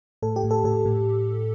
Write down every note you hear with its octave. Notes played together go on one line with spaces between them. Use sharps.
A2 A4
G4
A2
A4
A2 A4
A2